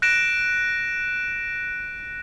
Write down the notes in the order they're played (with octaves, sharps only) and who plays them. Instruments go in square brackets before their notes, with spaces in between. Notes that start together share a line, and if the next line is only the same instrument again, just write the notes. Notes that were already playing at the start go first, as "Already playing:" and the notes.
[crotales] F#6 A#6 D7 E7